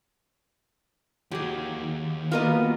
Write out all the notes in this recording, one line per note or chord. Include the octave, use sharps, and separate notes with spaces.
D#2 D#3 F#3 G4 G#4
G3 A#3 B3 F4 F#4 A#4 D#5